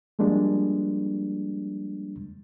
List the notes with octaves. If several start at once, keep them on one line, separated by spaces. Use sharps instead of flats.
F3 G3 G#3 A#3 D4